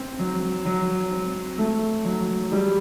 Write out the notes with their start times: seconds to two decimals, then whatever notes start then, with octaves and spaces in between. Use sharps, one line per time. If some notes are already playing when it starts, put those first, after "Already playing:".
Already playing: C4
0.19 F#3
0.65 F#3
1.11 C4
1.58 A3
2.05 F#3
2.52 G3